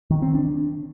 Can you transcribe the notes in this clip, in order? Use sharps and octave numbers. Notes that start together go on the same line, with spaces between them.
D#3
C4
D4